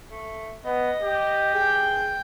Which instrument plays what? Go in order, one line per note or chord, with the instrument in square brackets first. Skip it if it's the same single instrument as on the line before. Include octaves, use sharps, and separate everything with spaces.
[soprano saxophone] A3
[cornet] B3 [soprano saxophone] D#5
[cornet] G4
[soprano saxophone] G#4 [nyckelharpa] G5